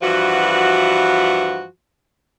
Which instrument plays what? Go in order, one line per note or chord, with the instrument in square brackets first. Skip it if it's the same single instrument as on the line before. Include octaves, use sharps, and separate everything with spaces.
[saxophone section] G2 E3 F3 F#4